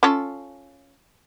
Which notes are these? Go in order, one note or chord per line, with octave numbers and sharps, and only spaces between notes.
C#4 F4 A4